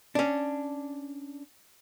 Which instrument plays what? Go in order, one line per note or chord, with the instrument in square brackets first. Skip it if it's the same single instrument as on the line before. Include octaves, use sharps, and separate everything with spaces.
[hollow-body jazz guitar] C#4 D4